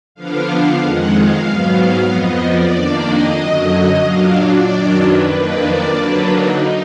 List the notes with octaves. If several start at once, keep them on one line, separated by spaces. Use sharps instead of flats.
D3 F3 B3 D4 F5
F2 D#3 G#3 F#5
F5
G#2 F#3 B3
F2 F3 B3 D#5
D5
F2 D#3 A#3 D4
D#5
F#2 D3 F#3
A#2 F#3 D4 F5
D5
F#2 D#3 F#3 D4
B4
F2 D#3 A#3 D4 B4
D5
D3 F#3 A#3 D4 B4
D#4